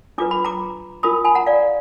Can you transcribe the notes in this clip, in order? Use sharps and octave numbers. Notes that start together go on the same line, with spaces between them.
D4 F4 B4 D6
B5
A#5 D6
D4 F4 A#4 B5 D#6
G#5 B5
F#5 A#5
D5 F5